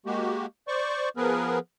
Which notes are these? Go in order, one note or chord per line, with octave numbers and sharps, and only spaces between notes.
G#3 A#3 F#4 G4
C5 D5 C#6
F3 B3 G#4 A#4 B4